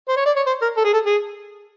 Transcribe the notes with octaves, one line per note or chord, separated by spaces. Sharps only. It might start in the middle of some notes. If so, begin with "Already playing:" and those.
C5
C#5
D5
C#5
C5
A#4
A4
G#4
A4
G#4